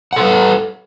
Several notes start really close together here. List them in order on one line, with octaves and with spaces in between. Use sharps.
F#5 A4 B4